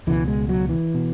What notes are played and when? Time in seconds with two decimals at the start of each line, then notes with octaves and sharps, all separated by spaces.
0.07 C#2 B2 E3
0.28 G#3
0.49 F#3
0.69 E3
0.94 B2